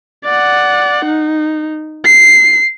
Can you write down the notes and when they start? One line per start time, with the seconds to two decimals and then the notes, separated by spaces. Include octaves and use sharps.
0.25 D5 F#5
1.05 D#4
2.05 C7